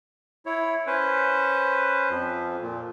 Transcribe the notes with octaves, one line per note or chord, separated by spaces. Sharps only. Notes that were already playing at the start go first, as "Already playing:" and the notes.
E4 C#5
C#4 B4 C5
F2 F3
A#2